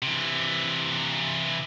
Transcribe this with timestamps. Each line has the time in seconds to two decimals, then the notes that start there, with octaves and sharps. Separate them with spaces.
0.02 C3 E3